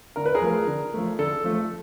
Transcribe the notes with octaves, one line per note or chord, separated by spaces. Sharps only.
D3 A#4
B4
G#4 A#4
F3 A3
D3
F3 A3
D3 A4
F3 A3